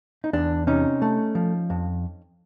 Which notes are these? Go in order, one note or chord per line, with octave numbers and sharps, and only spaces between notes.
D#4
E2 D4
C3 C#4 D#4
A3
F3
F2